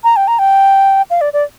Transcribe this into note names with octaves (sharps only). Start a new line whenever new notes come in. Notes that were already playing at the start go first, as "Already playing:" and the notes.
A#5
G5
A#5
G5
F5
D5
D5